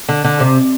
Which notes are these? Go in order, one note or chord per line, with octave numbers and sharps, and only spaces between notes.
D3
D3
C3